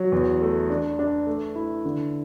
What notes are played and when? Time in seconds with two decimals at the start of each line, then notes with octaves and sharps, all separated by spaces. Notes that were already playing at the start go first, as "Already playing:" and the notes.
Already playing: F#3
0.12 E2
0.41 A3
0.70 D4
0.99 D4
1.26 A3
1.55 E4
1.85 D3